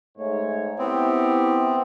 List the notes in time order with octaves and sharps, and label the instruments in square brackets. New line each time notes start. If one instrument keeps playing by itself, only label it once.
[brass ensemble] G#2 A3 C#5
[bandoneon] B3 C4 [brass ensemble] E4 G4